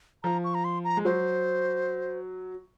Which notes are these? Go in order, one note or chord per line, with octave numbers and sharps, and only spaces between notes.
F3 A#5
C#6
A#5
C6
A#5
G#3
F#3 C5